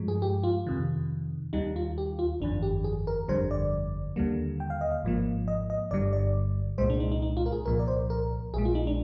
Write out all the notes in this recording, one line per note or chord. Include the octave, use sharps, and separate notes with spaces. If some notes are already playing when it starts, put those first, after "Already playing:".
Already playing: G2 F3 G#3
G#4
G4
F4
F2 C3 D#3
D#2 D#3 G3 D#4
F4
G4
F4
G1 F2 D#3 D4
G4
G#4
A#4
G1 F2 D3 G3 C5
D5
D#2 D3 G3 A#3
G5
F5
D#5
F5
G#1 G#2 F3 A#3
D#5
D#5
G1 G2 D3 G3 D5
D5
C2 A#2 G#3 C5
D4
D#4
D#4
D#4
F4
A#4
G#4
C2 A#2 F3 A#4
D5
C5
A#4
A#1 A#2 G#3 G#4
F4
D#4
D4